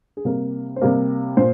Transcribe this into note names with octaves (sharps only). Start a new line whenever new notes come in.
G#4
C3 G3 A#3 A#4
C5
C3 G3 A#3 A#4
A#2 C5